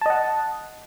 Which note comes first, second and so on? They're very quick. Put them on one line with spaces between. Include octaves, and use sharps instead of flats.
A5 D#5 F#5